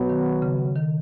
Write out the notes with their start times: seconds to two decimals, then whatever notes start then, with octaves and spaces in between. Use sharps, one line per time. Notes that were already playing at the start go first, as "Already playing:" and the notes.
Already playing: B2 F#3 B3
0.09 D#3
0.42 C#3
0.76 D#3